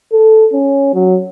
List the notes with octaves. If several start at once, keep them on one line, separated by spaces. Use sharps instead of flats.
A4
C#4
F#3